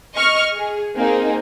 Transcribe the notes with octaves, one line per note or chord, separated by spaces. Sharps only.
D#5 C#6 F6
G#4
A#3 C4 D#4 G#4